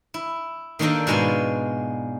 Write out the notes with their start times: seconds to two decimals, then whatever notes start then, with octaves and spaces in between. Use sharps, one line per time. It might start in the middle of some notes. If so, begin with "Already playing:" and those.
0.14 E4
0.79 D#3 A#3 D4 G4 A4 D#5
1.07 G#2 B2 G#3 F4 G#5